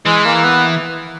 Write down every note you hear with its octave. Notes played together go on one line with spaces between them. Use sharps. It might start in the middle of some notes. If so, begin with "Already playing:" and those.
E3 G#3
A#3
B3